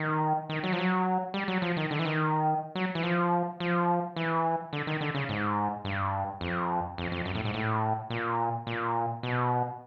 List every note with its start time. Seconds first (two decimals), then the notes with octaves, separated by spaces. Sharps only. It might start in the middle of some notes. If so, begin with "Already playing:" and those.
Already playing: D#3
0.49 D#3
0.64 F#3
0.73 F3
0.79 F#3
1.34 G3
1.48 F#3
1.62 F3
1.77 D#3
1.91 D3
1.99 E3
2.05 D#3
2.75 F#3
2.95 E3
3.03 F3
3.60 F3
4.16 E3
4.73 D3
4.87 D#3
5.01 D3
5.14 C#3
5.29 G#2
5.85 G2
6.41 F2
6.98 F2
7.12 F2
7.25 F#2
7.35 A2
7.45 G#2
7.54 A2
8.10 A#2
8.67 A#2
9.23 B2